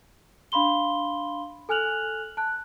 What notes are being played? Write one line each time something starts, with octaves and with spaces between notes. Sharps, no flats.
D4 F5 B5 C6 G7
A4 G#5 F6 F#6 F7 F#7
A5 F#6